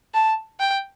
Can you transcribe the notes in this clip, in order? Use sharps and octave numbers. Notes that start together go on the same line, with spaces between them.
A5
G5